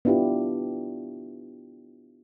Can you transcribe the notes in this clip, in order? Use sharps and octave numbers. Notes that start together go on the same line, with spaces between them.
B3 D4 E4 F4 G4